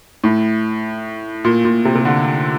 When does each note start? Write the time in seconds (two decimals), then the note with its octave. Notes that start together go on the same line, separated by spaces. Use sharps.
0.24 A2
1.45 A#2
1.65 A#2
1.85 C3
1.95 C3
2.05 D3